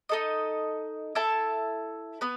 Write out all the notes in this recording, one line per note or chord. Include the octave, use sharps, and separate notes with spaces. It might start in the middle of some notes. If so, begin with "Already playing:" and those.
D#4 A4 D#5
E4 A4 E5 A5
B3 B4